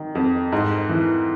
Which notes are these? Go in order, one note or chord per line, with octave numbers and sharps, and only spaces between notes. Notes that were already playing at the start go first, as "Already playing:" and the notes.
Already playing: D#3
F2
G#2
E3